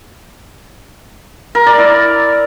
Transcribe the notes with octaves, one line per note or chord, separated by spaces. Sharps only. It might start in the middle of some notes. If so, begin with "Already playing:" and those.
A#4
D5
E4